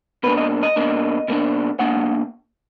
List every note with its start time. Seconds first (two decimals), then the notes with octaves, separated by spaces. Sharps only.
0.23 B2 A#3 D4 B4
0.37 D#5
0.63 D#5
0.76 B2 A#3 D4
1.28 B2 A#3 D4
1.79 B2 A#3 D4 F#5